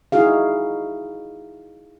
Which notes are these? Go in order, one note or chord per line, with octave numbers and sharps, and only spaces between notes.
D#4 E4 F#4 G#4 F5